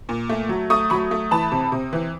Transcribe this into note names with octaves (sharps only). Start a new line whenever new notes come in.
A#2
A3
F#3
A3 C#6 D#6
F#3 B5 C#6
A3
E3 A5 B5
C3
C3
E3